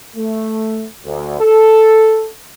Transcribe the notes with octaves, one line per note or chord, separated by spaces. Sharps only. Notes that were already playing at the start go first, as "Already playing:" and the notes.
A3
D2
A4